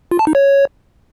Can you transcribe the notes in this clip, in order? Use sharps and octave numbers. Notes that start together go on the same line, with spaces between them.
F4
A5
D#4
C#5